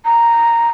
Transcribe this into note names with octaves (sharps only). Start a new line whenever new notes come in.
A#5